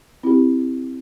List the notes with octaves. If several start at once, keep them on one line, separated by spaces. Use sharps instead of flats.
C4 E4 G4